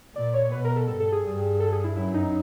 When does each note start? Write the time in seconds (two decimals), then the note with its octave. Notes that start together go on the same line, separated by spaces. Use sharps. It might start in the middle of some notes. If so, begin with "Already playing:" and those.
0.15 A#2 D5
0.34 C#5
0.52 B2 B4
0.65 A#4
0.76 A4
0.88 G2 A4
1.00 A4
1.12 G#4
1.24 G2
1.60 A4
1.72 G#4
1.84 E4
1.96 F#2 E4
2.14 D#4